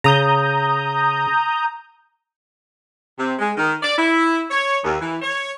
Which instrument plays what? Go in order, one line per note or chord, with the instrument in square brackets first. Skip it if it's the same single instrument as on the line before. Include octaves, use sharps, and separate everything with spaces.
[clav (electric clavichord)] C#3 [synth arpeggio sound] A#5 D#6 G6
[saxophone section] C3
G#3
D#3
D5
E4
C#5
D#2
E3
C#5